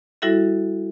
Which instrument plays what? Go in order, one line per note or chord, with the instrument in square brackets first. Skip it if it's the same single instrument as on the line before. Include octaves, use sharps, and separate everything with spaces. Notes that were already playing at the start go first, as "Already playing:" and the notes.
[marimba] G3 E4 F#4 A4 E5